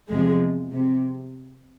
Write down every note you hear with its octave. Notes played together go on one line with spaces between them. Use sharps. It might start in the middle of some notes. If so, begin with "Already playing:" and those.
E2 C3 F3 G#3
C3